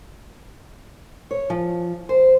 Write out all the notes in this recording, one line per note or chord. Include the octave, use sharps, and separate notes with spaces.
C#5
F3
C5